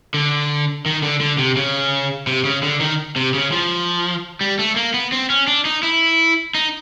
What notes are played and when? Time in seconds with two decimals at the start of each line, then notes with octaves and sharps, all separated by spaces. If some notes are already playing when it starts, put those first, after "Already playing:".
0.14 D3
0.86 D#3
1.03 D3
1.21 D3
1.38 C3
1.57 C#3
2.27 C3
2.45 C#3
2.63 D3
2.81 D#3
3.16 C3
3.34 C#3
3.52 F3
4.41 G3
4.59 A3
4.76 A#3
4.94 B3
5.12 C4
5.30 C#4
5.47 D4
5.65 D#4
5.83 E4
6.55 D#4